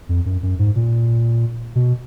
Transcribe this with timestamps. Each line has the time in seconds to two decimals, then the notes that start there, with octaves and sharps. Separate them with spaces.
0.09 F2
0.25 F#2
0.43 F#2
0.59 G#2
0.76 A#2
1.75 B2